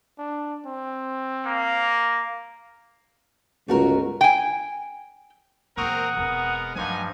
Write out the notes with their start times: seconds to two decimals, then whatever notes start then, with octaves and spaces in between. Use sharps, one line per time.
0.19 D4
0.66 C4
1.46 A#3
3.68 G1 C#2 A3 F#4 A#4
4.21 G5 G#5
5.77 E2 A#2 C4 A#4 F#5 C#6 D#6
6.17 E1 G#3 B3 C4 A#4
6.76 G2 F3 F#3 A3 D#4 F#5 G#5